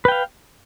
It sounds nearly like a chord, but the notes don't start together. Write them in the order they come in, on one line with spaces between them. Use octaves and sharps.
B4 G5 F5